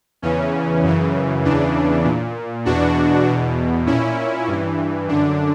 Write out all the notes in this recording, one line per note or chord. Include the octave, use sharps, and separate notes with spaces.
E2 C#3 E3 C#4
F#2 C#3 E3
E2 C#3 E3 D4
A#2
E2 B2 D4 F#4
E2 B2
A#2 C#4 E4
G2 E3
F#2 D3 D4